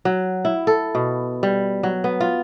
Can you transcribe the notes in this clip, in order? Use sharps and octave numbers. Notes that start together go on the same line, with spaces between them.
F#3
E4
A4
B2
G3
F#3
B3
F4